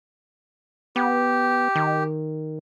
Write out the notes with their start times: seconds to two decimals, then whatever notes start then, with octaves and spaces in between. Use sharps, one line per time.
0.96 B3 G4
1.75 D#3